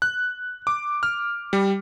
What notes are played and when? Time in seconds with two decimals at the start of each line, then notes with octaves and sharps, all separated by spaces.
0.02 F#6
0.67 D6
1.03 F6
1.53 G3